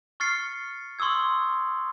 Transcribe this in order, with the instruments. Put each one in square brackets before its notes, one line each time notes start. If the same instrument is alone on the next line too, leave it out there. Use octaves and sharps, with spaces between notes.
[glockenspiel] C#6 F6 A6 C7 C#7
C6 C#6 D#6 E6 G#6